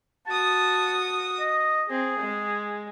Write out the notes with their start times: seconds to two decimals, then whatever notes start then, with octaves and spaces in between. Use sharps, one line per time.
0.27 F#4 A5 D#6
1.40 D#5
1.90 C4 G#4
2.20 G#3